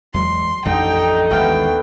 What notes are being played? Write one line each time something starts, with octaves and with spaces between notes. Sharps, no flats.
E2 F#3 G#3 C6
A1 F2 D3 D#4 G5
A1 D#2 G#3 A3 B3 F5 G5